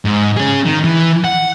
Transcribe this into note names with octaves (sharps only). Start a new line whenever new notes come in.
G#2
C#4 G#4
D#3
E3
F#5